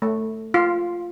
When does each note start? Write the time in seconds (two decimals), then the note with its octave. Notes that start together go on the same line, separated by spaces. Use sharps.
0.02 A3
0.54 F4